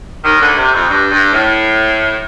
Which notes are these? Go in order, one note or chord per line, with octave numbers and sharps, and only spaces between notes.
D#2 D#3
D2 D3
C3
F2
G2
G2
A2